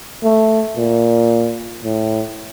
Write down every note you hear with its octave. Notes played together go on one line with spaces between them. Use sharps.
A3
A#2
A2